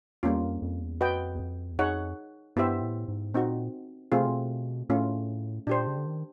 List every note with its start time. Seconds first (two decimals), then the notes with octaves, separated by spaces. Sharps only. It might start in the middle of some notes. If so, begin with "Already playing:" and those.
0.23 E2 G3 A#3 C#4 F4
0.43 F2
0.62 F2
0.81 E2
1.01 F2 F#4 B4 D#5 G5
1.35 E2
1.40 F2
1.72 E2
1.78 F2 D#4 G#4 C#5 F#5
2.56 G2 B3 E4 G4 C5 E5
2.82 A2
3.08 G#2
3.34 A#2 C4 D#4 F#4
4.12 B2 A3 C4 F4 G#4
4.20 C3
4.27 B2
4.89 A2 A3 C#4 F4
5.67 A#2 D4 G4 C5
5.87 C#3
5.97 D3
6.06 D#3